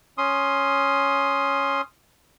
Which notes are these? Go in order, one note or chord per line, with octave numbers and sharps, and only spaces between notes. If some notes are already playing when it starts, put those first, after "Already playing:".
C#4 C6 D#6